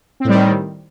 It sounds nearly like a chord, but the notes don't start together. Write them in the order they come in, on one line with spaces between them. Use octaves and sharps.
C4 A2 G3 D#3